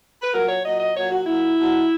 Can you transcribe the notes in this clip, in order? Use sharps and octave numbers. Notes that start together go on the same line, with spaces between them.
B4
A#2 F#3 A#4
C#5
A#2 F#3 D#5
D#5
A#2 F#3 C#5
F#4
A#2 F#3 E4
B2 F#3